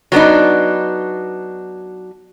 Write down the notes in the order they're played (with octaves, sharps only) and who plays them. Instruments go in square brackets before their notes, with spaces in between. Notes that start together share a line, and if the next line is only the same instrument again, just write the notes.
[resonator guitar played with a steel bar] F#3 B3 D4 D#4